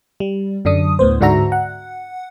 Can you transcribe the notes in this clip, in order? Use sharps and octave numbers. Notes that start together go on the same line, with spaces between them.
G3
F#2 D3 D4 D#6
D2 A2 B3 C5
G#2 D3 D4 F#4 E5 A#5
F#5